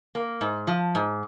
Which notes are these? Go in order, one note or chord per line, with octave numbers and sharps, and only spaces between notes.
A#3
G#2
F3
G#2